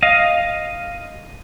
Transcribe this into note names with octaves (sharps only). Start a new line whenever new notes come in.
D#5 F5